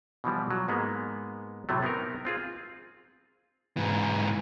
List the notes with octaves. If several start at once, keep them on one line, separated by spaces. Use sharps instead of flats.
B2 E3 F3 G3
F#3
G#2 G#3 A#3 B3
A2 C3 F#3 A3
B3 C4 D#4 A#4
C4 F4 G#4
G#2 E3